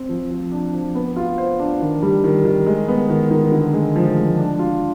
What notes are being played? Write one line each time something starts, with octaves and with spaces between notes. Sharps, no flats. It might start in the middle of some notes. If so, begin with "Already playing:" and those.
Already playing: C4
F3
F3
D4
F3
B3
F4
C5
D4
D#3
G3
D#3
D#3
G#3
B3
D#3
D#3
D3
G#3
F3
G#3
D4
F4